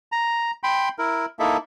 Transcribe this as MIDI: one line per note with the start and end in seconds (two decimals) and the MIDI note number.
0.12 0.51 82
0.63 0.89 79
0.63 0.89 83
0.63 0.89 84
0.99 1.26 64
0.99 1.26 70
1.39 1.57 58
1.39 1.57 63
1.39 1.57 64
1.39 1.57 69
1.39 1.57 76